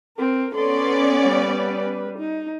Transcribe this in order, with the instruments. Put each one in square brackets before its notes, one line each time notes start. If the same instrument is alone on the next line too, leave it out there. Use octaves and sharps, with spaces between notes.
[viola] C4 A#4
[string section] B3 C#4 D5 [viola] A4 C6
[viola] G3 B4
D#4